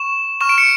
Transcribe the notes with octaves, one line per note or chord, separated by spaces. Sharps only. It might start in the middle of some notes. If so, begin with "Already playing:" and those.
Already playing: C#6 E7
C#6 F6 E7
D7
C#7